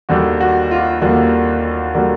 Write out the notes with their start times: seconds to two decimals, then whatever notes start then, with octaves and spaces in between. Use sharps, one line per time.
0.09 D#2 D3 G3 A#3 F#4
0.41 F#4
0.71 F4
1.01 D#2 D3 G3 A#3 F#4
1.94 D3 G3 A#3 F#4